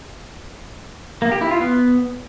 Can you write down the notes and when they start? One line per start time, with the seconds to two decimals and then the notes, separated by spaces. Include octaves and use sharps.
1.22 A#3
1.32 G4
1.41 E4
1.51 F4
1.61 B3